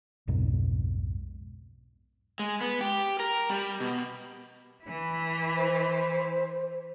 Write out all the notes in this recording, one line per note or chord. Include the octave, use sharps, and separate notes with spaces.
B1 F2 G#2 B2
G#3
B3
G4
A#4
G3
B2
E3 E4
C5